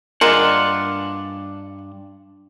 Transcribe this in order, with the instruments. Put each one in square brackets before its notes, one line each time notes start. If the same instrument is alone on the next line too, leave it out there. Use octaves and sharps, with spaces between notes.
[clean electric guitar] G2 D4 F#5 [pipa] G#3 A#3 F4